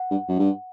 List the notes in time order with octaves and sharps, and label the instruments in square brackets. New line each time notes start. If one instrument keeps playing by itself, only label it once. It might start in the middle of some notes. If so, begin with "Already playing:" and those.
Already playing: [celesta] F#5
[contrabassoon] G2
F#2
G2